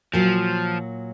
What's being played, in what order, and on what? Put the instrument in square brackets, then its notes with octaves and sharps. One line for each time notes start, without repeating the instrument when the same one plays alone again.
[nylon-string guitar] A#2 F#3 [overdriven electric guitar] F3